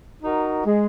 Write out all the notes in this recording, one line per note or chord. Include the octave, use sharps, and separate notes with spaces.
D#4 F#4 A#4
G#3